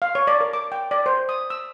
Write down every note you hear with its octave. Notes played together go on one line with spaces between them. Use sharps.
F5
C#5
D5
A#4
D6
G5
D5
C5
D#6
E6